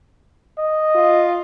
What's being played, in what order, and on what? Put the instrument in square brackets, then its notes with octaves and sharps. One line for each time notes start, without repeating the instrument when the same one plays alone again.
[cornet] D#5
[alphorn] F4